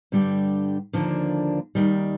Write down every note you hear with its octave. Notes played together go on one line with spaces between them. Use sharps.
G2 D3 G3 D4 G4
D#2 D3 F3 A#3 D4
D#2 D#3 G3